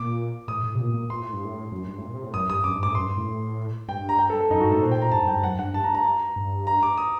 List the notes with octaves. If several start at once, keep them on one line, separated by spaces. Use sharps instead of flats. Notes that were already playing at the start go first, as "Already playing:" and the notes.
Already playing: A#2 D6
A2 D#6
A2
C3
A#2
A#2
A#2 C6
A2
G2
A2
F#2
G2
A2
A#2
C3
A2
F#2 D#6
G2 D#6
F#2 D6
G2
A2 D6
F#2 C6
G2
A2
G2 G5
A#5
G5
A4
A4
F#2 D#4
G2 F#4
A2 A4
A#2 C5
G5
A#2 A#5
G2 A5
F#2
G2 G5
F#2 F#5
G2 F#5
G2 A5
A#5
A#5
G2
A#5
D6
D#6